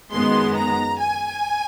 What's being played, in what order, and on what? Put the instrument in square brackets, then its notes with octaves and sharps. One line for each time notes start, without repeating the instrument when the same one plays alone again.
[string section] F#2 D#3 G#3 B3 C6
A#5
G#5